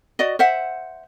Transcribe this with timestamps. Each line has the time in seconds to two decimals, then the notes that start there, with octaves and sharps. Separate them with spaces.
0.19 F#4 D5 D#5
0.39 C5 E5 F#5